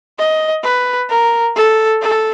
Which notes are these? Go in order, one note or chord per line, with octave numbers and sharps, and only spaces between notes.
D#5
B4
A#4
A4
A4